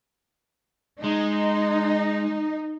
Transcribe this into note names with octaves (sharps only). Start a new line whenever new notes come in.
G#3 D#4